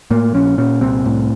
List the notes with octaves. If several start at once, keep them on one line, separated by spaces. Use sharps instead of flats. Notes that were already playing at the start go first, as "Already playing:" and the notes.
A2 A#3
A#1 C#4
A#2 C#4
C2 C4
A2